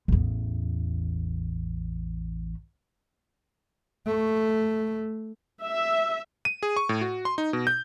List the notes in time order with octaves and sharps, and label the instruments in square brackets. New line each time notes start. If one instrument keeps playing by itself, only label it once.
[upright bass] A1 E2
[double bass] A3
[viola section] E5
[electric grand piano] D#7
G#4
C#6
A2
F#4
C6
D#4
B2
G6